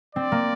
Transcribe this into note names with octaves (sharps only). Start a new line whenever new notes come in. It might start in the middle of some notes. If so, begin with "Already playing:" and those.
C4 D5
A#3